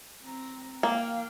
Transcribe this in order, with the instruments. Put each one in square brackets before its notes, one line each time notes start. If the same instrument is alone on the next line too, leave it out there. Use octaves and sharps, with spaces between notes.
[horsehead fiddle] C4 A#5
[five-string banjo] A#3 [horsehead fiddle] F5 G5